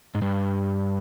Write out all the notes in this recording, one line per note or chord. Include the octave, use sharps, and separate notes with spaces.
G#2
G2